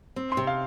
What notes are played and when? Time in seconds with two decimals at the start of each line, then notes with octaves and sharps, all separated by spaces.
0.16 C4
0.32 C6
0.37 C3
0.47 F5